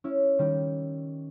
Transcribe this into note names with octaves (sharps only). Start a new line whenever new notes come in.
C#4 E4
D#3 G3